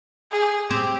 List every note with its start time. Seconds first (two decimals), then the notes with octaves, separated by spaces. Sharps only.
0.31 G#4
0.70 C4 G4